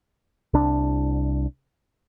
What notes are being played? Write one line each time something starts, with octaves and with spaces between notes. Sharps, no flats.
C2 D4